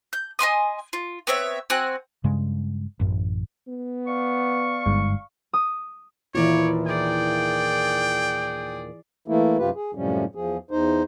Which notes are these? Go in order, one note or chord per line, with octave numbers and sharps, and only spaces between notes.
G6
D#5 G#5 C6 D#6
F4
B3 C4 C#5 E5
C4 F#4 G#5 F#6
G2 C#3 G#3
A1 F#2
B3
D5 F5 C#6
G1 G#2
D#6
D#2 A#2 D#3 E3 E4 F4 C#5 D5
G#4 D5 G5
E3 A3 A#3 E4
F#2 C3 F4 G4 B4
G#4
F#2 A2 C3 F3 G3 C#4
E2 F3 G#4
E2 D#4 C5